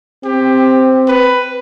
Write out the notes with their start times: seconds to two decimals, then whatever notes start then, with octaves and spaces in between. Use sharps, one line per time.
0.24 C4 G4
1.08 B4